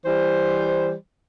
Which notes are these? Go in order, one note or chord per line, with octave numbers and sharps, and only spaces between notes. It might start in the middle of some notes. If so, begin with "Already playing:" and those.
E3 G3 C5